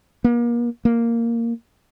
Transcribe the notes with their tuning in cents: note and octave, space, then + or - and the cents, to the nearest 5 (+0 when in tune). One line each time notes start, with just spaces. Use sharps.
A#3 +35
A#3 -5